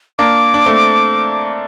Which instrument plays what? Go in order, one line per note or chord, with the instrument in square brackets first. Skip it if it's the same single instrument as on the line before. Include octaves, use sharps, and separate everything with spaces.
[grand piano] A#3 D4 [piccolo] D6
[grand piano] D4
A3 C4